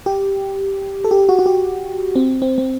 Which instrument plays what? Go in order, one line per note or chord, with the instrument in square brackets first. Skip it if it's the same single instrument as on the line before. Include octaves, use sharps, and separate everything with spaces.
[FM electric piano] G4
A4
G4
F#4
F#4
G4
C4
C4
C4